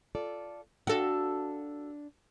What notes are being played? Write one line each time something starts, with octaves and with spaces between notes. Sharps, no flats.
F4 A4 D5
D4 F#4 A4 F5